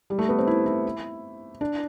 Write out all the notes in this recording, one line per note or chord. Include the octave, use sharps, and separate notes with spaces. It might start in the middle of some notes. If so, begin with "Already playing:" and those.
G3
A3
B3
C4
E4
E4
D4